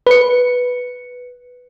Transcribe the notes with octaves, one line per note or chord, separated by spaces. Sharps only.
B4 C#7